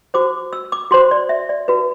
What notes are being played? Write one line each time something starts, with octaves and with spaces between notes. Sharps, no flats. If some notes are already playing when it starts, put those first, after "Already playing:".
F#4 C5 D6
E6
D6
F#4 C5 C6
D5
E5
D5
F#4 B4